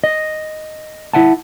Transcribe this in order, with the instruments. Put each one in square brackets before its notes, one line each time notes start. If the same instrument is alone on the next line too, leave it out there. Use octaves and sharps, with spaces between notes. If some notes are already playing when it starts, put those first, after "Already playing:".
[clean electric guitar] D#5
E4 E5 F#5 A5